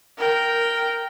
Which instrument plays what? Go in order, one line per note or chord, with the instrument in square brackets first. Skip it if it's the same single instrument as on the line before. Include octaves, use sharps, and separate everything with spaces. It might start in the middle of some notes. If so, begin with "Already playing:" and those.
[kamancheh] A#4 G5